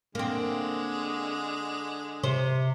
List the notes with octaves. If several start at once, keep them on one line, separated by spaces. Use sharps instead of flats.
D3 G#3 A#3 C4
C3 C5